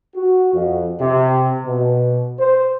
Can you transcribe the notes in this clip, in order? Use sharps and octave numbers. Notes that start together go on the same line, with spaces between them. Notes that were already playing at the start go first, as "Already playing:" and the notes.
F#4
F2
C3
B2
C5